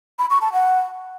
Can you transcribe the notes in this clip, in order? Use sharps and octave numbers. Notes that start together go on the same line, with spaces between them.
B5
C#6
A5
F#5